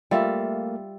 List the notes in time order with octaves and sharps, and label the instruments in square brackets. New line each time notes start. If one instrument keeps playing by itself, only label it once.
[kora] G3 F4 E5 [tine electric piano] A3 A#3